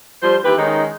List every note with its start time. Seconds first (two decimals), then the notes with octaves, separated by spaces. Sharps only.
0.22 F3 G3 C5
0.44 D#2 E3 G4 B4
0.57 D#3 G#3 C#4 D#4